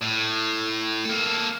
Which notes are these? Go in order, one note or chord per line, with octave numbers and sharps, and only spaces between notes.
A2
A#3 A4